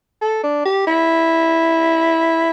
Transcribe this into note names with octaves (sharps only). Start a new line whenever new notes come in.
A4
D4
G4
E4